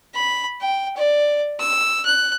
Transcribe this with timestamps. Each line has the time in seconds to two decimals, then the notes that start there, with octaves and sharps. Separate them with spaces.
0.15 B5
0.61 G5
0.97 D5
1.60 E6
2.05 F#6